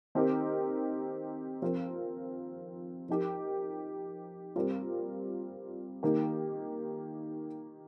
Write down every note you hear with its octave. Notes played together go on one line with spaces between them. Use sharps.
D#3 C4 D#4 G4 A#4
F3 C4 F4 A#4
F3 D#4 G4 A#4
G3 C4 F4 A#4
D#3 A#3 G4